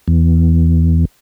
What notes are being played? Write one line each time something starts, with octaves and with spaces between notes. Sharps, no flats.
E2